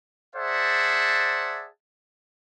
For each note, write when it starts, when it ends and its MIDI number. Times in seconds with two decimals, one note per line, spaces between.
0.35 1.68 68
0.35 1.68 72
0.35 1.68 74
0.35 1.68 76
0.35 1.68 78
0.35 1.68 81